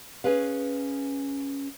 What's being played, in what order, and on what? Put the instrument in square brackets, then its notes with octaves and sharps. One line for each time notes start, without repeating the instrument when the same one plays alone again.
[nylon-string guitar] C#4 G#4 B4 F5